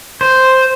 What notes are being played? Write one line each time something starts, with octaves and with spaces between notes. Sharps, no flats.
C5